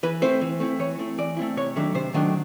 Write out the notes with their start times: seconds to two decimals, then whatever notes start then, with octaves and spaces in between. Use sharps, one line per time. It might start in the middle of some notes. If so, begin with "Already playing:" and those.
0.03 E3 B4
0.22 A3 C4 E4 C5
0.41 E3
0.60 A3 C4 E4
0.79 E3 C#5
0.99 A3 C4 E4
1.18 E3 D5
1.37 A3 C4 E4
1.56 C3 C#5
1.76 D#3 F#3 A3 D4
1.95 C3 C5
2.14 D#3 F#3 A3 D4